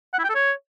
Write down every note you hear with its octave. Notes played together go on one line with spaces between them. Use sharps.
F#5
E4
G5
A4
C#5